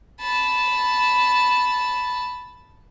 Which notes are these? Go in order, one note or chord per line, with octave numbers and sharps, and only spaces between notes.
A5 B5